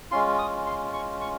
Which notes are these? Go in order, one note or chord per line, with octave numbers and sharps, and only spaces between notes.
G#3 C#4 F4 C6
D#6
C6
C#6
C#6